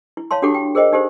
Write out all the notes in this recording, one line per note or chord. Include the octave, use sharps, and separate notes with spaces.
E4
C#5 F5 A5 C6
D4 F#4 G4 A4 F#5 D6
G5
G#4 A#4 C5 D#5 G5
D#4 G4 A4 C5